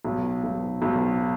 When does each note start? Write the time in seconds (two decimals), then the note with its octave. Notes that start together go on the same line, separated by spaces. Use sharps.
0.05 B1
0.44 B1
0.82 B1